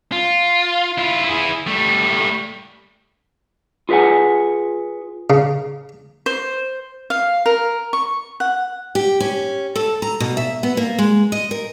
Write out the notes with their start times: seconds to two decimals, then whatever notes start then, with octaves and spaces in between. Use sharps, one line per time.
0.12 F4
0.98 E4 F4
1.25 E4 G#4
1.67 G3 A3
3.89 F4 G#4 B4 E5 F#5 G#5
5.30 C#3
6.26 C5
7.10 F5
7.46 A#4
7.93 C#6
8.40 F#5
8.95 G4
9.20 C#4
9.76 A4
10.02 A#5
10.20 B2
10.37 E5
10.63 B3
10.77 A#3
10.99 G#3
11.32 D#5
11.51 A#4